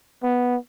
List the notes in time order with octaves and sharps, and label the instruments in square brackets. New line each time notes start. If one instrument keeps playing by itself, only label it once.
[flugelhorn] B3